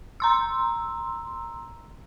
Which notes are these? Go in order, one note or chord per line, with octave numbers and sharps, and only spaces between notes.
A#5 C6 E6